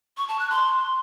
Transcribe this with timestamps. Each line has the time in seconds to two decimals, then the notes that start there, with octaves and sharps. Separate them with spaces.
0.17 C#6
0.28 A5
0.39 F#6
0.50 C6